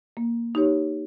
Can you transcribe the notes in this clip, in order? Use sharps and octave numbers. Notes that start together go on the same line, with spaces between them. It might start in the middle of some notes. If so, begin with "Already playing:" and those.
A#3
D#4 G4 C#5